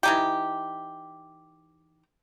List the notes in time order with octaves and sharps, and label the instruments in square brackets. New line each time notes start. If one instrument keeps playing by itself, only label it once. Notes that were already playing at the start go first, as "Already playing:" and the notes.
[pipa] E3 D#4 G4